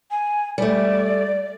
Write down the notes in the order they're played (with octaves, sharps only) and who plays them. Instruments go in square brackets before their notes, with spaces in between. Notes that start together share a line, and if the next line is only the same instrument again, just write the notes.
[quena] G#5
[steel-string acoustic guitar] G3 A3 [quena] D5